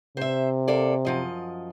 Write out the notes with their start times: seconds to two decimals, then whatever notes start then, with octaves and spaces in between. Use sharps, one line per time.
0.17 C3 C5 E5
0.68 A#3 A4 D5
1.05 F#2 F3 D#5